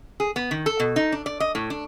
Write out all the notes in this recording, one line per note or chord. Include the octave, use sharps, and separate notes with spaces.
G#4
B3
D#3
A4
B2
D#4
D4
D5
D#5
A2
D4